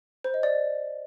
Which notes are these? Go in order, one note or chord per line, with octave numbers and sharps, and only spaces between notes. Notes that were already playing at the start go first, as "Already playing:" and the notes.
C5
D#5
D5